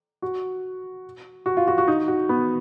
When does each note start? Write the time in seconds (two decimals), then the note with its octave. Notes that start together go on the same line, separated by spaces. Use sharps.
0.22 F#4
1.46 F#4
1.57 F4
1.67 F#4
1.78 F#4
1.88 D#4
2.08 F#4
2.29 B3